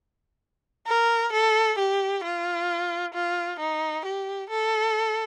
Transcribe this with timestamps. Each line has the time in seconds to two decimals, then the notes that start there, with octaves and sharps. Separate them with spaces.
0.87 A#4
1.32 A4
1.78 G4
2.24 F4
3.13 F4
3.59 D#4
4.05 G4
4.50 A4